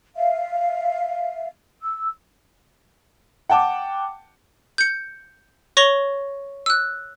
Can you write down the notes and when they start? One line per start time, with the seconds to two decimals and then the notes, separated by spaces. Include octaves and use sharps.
0.16 E5 F5
1.81 E6
3.49 F#5 G5 A5 D6
4.78 G6 C#7
5.77 C#5 C#6 A#6 F7 G7
6.66 E6 F#6